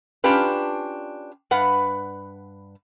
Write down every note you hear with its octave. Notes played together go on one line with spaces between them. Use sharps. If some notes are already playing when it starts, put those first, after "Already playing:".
C#4 D4 F4 G4 B4
G2 B4 F#5